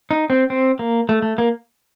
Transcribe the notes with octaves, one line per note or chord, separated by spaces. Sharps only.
D#4
C4
C4
A#3
A3
A3
A#3